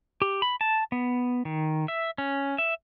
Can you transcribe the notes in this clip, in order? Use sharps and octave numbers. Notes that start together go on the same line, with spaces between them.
G4
B5
A5
B3
D#3
E5
C#4
E5